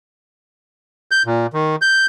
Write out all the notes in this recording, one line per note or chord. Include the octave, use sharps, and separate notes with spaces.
G6
A#2
D#3
G6